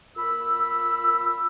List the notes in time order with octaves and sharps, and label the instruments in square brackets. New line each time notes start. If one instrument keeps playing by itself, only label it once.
[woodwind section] A#2 B5 E6